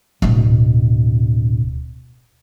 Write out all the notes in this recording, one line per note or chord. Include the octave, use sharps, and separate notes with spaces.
D1 B2